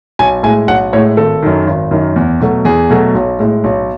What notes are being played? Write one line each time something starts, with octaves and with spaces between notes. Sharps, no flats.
B1 G#5
A2 G#3 G#5
B1 F#5
A2 G#3 C#5
G#1 A4
F#2 D#3
G#1
F#2 D#3
E2
B2 F#3 A3
E2 G#4
B2 F#3 A3
B1
A2 G#3
B1